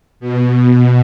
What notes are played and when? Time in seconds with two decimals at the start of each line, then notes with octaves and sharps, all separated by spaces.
0.20 B2
0.55 B2